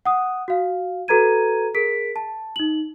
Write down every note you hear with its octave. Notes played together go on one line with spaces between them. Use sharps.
F#5 D#6
F#4 F5
F#4 A4 B4 A#5 G#6 D#7
G#4 A#4 B6 D7
A5
D#4 F#7